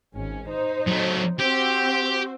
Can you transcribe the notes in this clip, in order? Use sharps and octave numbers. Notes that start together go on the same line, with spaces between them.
G#1 C#4
D#4 C5
F#3 A3
C4 F#4 G4 C5